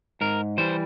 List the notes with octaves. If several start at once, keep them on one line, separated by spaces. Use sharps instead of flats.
G#2 A#4
E3 G3 C5